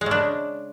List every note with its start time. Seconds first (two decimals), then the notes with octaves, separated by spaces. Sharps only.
0.01 G#3
0.06 C#3
0.11 D4